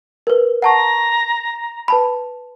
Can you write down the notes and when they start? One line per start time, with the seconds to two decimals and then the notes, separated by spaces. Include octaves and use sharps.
0.27 A#4 B4
0.62 F#5 A5 A#5 C#6
1.88 B4 A5 B5